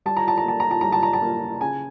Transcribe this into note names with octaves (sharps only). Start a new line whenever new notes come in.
G3 A5
A#5
A5
A#5
A#3 A5
A#5
A5
G3 A#5
A5
A#5
A5
A#3
C#3 G#5